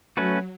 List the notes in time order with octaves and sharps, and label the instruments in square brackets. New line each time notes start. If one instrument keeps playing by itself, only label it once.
[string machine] F#3 [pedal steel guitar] A3 C#4 F#4 B4